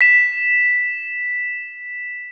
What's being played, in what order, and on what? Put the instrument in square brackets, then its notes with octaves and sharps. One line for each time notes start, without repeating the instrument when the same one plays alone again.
[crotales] B6 E7